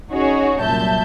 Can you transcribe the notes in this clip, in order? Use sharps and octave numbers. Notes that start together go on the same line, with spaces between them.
C#4 D#4 F#4 G#4 C#5
C2 F#2 A#2 E5 A5 G6